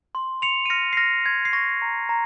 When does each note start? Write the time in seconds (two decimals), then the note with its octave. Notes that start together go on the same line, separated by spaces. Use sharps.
0.15 C6
0.42 C6 C#7 F7
0.66 D#7
0.70 F6 A#6 C#7
0.93 C7
0.97 F6 A#6
1.26 C6 G#6
1.45 C7
1.53 C#6 A#6
1.82 A#5
2.09 A#5